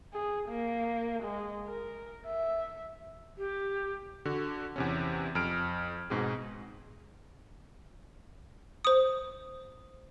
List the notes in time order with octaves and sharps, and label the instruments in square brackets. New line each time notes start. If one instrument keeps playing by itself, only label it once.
[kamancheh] G#4
A#3
G#3
A#4
E5
[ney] G4
[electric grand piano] D3 F#4
E2 C3 C#4
F2 F6 D7
G#2 B2 C4 G#4
[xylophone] C5 D#6